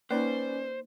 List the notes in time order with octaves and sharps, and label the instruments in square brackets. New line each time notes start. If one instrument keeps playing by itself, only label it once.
[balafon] A#3 D#4 [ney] C#4 [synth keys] B4 D5 [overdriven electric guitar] C5